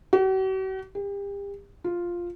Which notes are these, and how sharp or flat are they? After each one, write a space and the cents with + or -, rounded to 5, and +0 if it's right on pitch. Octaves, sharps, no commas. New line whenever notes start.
F#4 +45
G4 +35
F4 +0